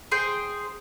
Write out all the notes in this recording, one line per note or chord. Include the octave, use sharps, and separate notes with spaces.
G#4 C5 G5